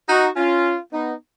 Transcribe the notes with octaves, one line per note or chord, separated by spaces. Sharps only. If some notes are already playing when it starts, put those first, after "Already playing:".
D#4 F#4
C#4 F4
B3 D#4